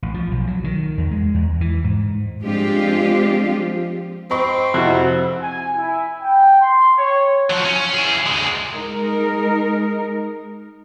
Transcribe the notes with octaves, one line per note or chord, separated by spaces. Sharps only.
A1
F3
B1
F#3
D#3
E2
G#3
E2
E3
G#2
F3 G#3 C4 D4 F4 G4
C4 D#5 B5 C#6
F2 C3 E4 F#4 F#6
G#5
E4
G5
C6
C#5
F3 F#3
C#4
E4 G#4
D2 G#3
G#3 D#4 A#4